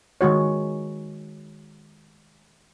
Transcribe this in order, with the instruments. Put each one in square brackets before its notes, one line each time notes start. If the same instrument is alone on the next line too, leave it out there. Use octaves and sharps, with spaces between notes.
[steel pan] D#3 G#3 F#4 C#5